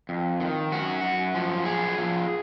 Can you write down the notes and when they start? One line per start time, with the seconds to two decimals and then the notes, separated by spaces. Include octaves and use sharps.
0.09 F2
0.40 D#3
0.72 F#2 F#4
1.04 F#2
1.35 F3
1.65 F3 G#4
1.98 F3